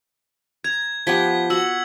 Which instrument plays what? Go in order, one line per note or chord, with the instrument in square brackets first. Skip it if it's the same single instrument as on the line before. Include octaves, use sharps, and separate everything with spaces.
[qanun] A#5 [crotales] G#6
[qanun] F3 B3 G4 [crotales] G#6 B6 G7
[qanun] F#4 [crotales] E6 F#7